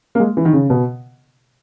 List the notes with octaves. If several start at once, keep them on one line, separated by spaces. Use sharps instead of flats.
A#3
G#3
E3
D#3
C#3
B2